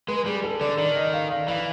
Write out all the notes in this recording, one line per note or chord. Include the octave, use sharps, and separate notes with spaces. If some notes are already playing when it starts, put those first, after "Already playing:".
G#3 B4
G3 G#4
A4
D3 D5
D#3 D5
D#5
F5
F5
E3 F5